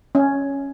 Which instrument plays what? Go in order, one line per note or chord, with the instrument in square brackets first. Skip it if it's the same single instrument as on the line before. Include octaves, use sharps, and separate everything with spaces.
[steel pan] C#4